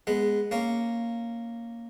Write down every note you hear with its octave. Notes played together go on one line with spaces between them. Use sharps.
G#3 B3
A#3 C#4